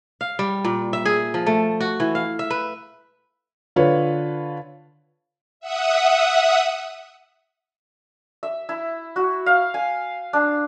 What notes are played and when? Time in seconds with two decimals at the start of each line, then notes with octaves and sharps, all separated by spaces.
0.21 F5
0.39 G3
0.64 A#2
0.93 E5
1.05 G#4
1.34 F3
1.46 A3
1.80 F#4
2.00 E3
2.15 F5
2.39 E5
2.50 B4
3.76 D3 F4 B4 C#5
5.60 E5 F#5 D#6
8.43 E5
8.69 E4
9.16 F#4
9.46 F5
9.74 G#5
10.33 D4